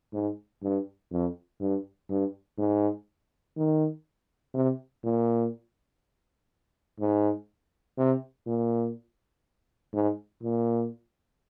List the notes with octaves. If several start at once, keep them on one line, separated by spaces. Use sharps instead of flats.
G#2
G2
F2
G2
G2
G#2
D#3
C3
A#2
G#2
C3
A#2
G#2
A#2